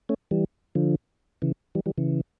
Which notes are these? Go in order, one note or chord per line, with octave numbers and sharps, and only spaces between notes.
A3 C#4
E3 G3
D3 F3
C#3 E3
E3 G3
E3 G3
C#3 E3